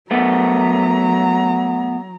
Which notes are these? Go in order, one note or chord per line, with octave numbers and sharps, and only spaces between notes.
F#3 A3 B3 A#5